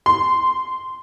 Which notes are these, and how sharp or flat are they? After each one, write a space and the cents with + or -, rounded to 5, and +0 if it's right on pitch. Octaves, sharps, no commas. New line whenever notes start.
C6 -15